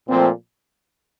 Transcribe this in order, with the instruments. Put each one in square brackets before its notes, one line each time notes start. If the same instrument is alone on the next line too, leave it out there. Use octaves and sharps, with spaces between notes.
[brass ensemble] A#2 F3 A3 C4